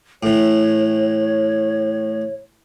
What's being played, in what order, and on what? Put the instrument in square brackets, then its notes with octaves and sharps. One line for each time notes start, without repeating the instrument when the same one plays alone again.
[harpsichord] A2 E3 [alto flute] C#5